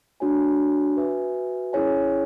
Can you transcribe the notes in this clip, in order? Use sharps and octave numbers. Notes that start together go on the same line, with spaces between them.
D4 F#4 C#5 G#5
F#4 B4 E5 G#5
C#4 E4 G#4 C#5 G#5